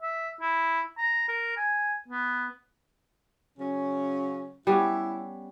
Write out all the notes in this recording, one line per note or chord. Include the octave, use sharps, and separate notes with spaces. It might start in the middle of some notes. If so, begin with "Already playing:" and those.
E5
E4
A#5
A#4
G#5
B3
C#3 F#3 C#4
G3 B3 C#4 E4